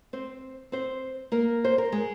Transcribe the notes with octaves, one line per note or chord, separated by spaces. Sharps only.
C4 C5
C4 C5
A#3 A#4
C5
A#4
G#3 G#4